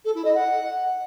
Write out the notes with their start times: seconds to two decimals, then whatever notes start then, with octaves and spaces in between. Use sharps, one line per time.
0.05 A4
0.14 E4
0.24 D#5
0.34 F#5